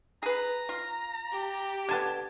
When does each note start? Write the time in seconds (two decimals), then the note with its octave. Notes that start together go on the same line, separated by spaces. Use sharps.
0.23 G#4 B4 A#5
0.69 F4
1.32 G4
1.89 D3 B3 A5 G#6